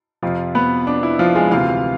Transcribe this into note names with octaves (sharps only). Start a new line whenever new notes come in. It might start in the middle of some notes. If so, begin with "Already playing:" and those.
F2 C3 F3 F4
B3 B4
D4
E4
F3 F4
G#3 G#4
D2 C3 E3 F4 F5